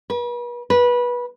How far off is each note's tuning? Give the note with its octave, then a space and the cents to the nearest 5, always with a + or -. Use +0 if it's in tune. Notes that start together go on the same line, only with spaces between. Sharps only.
B4 -40
B4 -20